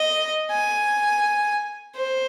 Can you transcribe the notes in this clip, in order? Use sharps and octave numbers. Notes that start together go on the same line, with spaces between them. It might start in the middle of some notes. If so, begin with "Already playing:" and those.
Already playing: D#5
G#5
C5